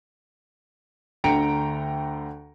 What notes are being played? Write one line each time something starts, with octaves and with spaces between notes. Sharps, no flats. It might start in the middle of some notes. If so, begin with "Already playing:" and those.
D2 D3 G5 A#5 C#7 D7